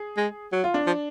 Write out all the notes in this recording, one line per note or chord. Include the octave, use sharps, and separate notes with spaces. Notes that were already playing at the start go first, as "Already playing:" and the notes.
Already playing: G#4
G#3
F#3
F4
D4
F3